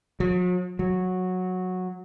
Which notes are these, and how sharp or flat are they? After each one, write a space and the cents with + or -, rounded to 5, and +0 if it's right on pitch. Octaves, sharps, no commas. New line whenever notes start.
F#3 -45
F#3 -10